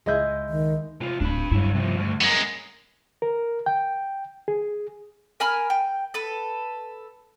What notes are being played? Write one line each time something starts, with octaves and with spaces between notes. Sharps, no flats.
C#2 G#3 E4 G#4 D#5 G6
D#3
C3 F4
D1 D4 B5
G2 F#3 E4
C3 F3
D2
F#2 G#3 B3 A#4
A#4
G5
G#4
A#4 G#5 B5 F6
G5
A4 B4